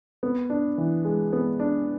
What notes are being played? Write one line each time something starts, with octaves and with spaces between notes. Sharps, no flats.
B3
D4
E3
G#3
B3
D4